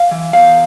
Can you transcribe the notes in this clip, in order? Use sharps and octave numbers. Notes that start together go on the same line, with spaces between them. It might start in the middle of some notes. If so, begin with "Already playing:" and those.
Already playing: F5
E3
E2 F5